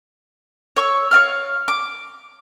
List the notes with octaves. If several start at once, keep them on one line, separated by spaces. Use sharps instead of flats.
C#5 C#6 E6
C#5 D5 F5 F6
D6